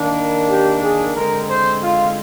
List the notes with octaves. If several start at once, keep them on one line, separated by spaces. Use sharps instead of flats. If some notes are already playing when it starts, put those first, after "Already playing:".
Already playing: D#3 A#3 D4
G4
G#4
D3 G#3 C4 A#4
C5
F4